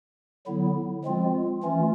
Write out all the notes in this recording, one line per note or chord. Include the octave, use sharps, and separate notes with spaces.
D3 F#3 B3 E4
F3 G#3 C4 F4
E3 A3 C#4 F4